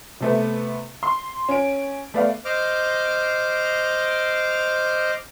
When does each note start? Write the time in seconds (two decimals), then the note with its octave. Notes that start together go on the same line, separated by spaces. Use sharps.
0.20 C3 A3 B3
1.03 C6
1.49 C#4 D7
2.14 A3 B3 D5 F5
2.45 C5 D#5 D6 F6